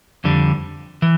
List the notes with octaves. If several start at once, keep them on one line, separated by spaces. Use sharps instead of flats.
F2 D3 G3
E3